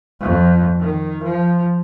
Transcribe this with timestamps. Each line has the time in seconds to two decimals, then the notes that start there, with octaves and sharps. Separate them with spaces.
0.21 F2
0.80 D#3
1.23 F3